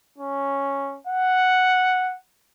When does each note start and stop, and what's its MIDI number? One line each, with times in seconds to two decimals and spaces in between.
0.18 0.98 61
1.07 2.17 78